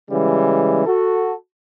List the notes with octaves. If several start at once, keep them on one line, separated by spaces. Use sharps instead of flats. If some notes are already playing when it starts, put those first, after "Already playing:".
C#3 E3 G3 G#3
F#4 A4